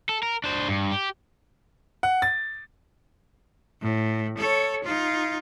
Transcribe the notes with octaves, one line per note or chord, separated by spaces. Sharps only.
A4
A#4
D4 C5
G2
G4
F#5
A6
A2
A4 C#5
D#4 F4